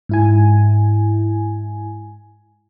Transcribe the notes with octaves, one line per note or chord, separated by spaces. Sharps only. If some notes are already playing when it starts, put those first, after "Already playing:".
G#2 E4 G#5